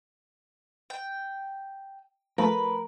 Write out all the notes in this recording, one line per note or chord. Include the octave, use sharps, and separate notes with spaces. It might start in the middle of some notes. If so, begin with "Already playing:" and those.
G5
F3 A3 A#4 B4